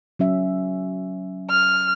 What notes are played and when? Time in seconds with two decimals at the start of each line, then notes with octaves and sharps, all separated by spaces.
0.19 F#3 C#4 E5
1.50 F6